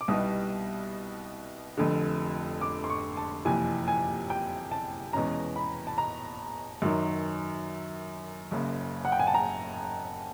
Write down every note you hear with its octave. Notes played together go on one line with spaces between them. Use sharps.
D6
C2 B2 G3 B3 D#4 D#6
F1 F2 D3
D6
C6
C#6
A5
F#1 F2 C3 E3 G#5
G#5
G5
A5
E2 B2 G#3 C#4 A#5
B5
A5
A#5
F#2 D#3 F#3
F#1 F#2 C#3
F#5
G5
G#5
A5
A#5